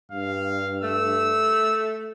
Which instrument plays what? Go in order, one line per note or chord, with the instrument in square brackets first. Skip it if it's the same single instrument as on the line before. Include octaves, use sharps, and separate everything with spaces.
[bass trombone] G2 [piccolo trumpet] F5
[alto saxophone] A3 [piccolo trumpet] E6